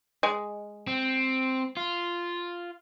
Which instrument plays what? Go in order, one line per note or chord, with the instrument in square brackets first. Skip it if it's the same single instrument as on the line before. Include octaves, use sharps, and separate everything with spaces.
[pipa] G#3
[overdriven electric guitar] C4
F4